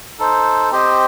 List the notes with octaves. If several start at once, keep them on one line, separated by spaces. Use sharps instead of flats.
D#4 A4 C5
C4 G4 C5 D#5